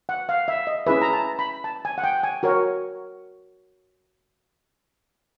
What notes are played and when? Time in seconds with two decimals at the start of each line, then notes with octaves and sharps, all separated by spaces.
0.09 F#5
0.29 F5
0.48 E5
0.67 D#5
0.87 C#4 E4 G#4 B4 E5
1.02 A#5
1.13 A5
1.39 B5
1.64 A5
1.85 G#5
1.98 F#5
2.04 G5
2.23 G#5
2.43 F#4 A#4 C#5